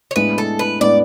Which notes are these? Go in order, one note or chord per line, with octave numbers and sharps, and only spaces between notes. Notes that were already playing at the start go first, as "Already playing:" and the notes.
C#5
A2 G#3 B3 D4 B4
A4
B4
A2 G#3 B3 D4 D5